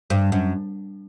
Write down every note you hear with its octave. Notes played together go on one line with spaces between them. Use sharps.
G2
F#2